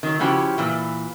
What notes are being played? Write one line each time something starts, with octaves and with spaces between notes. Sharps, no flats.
D#3 F#3
C#3 F3 C#4 E4 F#4 G4
A#2 E3